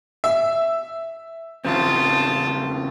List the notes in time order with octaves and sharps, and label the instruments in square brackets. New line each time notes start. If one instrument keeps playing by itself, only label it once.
[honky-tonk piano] E5
[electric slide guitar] E2 C#3 C4 [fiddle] F4 A5